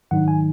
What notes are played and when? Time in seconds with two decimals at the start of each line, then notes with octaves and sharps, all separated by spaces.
0.11 G#2 D#3 F#3 D#4 F#5
0.28 G#5